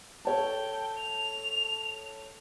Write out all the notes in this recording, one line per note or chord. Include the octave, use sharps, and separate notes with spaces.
A4 C#5 G5 A5
F7